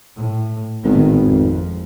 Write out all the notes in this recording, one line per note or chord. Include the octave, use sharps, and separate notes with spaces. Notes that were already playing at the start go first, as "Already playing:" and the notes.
A2
G#1 A2 D#3 B3
F2